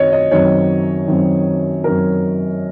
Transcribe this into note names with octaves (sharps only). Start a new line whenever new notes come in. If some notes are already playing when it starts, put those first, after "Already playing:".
Already playing: F#2 D#3 F#3 C4 C#5 D#5
D#5
F#2 D#3 F#3 C4 C#5
F#2 D#3 F#3 C4
F#2 D#3 F#3 C4 A#4